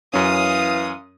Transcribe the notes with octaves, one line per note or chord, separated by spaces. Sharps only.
F#2 E3 C#4 F5 D#6